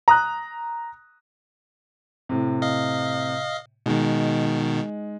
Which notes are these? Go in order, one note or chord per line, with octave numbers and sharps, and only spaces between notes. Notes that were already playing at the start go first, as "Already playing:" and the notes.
A#5 D#6 F#6
A2 C3
D#5 F5
B2 D#3 G#3 D#4